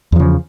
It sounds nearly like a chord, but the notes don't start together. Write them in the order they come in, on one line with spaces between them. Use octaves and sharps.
E2 F3 C#3